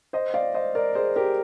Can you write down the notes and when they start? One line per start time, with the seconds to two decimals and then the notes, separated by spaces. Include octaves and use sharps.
0.13 C5 D#5
0.34 D5 F5
0.54 C5 D#5
0.75 A#4 D5
0.95 G#4 C5
1.16 G4 A#4